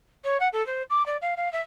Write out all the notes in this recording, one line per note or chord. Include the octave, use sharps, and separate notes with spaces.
C#5
F#5
A4
C5
D6
D5
F5
F5
E5